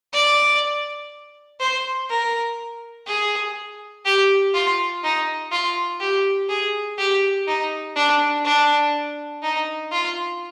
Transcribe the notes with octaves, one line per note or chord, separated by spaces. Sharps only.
D5
C5
A#4
G#4
G4
F4
D#4
F4
G4
G#4
G4
D#4
D4
D4
D#4
F4